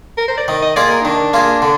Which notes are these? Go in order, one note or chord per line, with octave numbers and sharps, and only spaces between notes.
A#4
C5
D5
D#3 D#5
D#5
A#3 F4 G#4 D5
A#4
D#4
D#3 D4
A#3 F4 G#4
D3